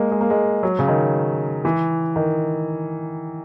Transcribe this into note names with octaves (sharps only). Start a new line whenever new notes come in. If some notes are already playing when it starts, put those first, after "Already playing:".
Already playing: G#3 A#3
G#3
A#3
G#3
F#3
C#3
D#3
E3
D#3